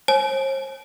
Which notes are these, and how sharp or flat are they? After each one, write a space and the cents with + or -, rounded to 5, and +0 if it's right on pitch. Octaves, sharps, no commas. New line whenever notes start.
C5 +45 G#5 +40